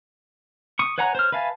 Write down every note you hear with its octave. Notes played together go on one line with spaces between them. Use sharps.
C#6 D#6
B4 C#5 F#5 G#5 A#5
C5 C#5 F6
B4 E5 F5 G#5 A5